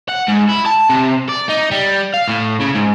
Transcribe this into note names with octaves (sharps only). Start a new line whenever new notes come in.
F#5
G#2
E4
A5
C3
D5
D#4
G3
F5
A2
C#3
G#2